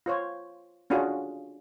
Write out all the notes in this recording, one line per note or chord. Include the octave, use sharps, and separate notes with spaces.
F4 C5 C#5
C#4 D4 F4 F#4 G#4